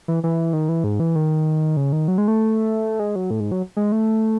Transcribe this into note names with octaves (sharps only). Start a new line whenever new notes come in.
E3
E3
D#3
E3
G#2
E3
D#3
C#3
D#3
F#3
G#3
A3
G#3
F#3
A2
G#2
F#3
G#3
A3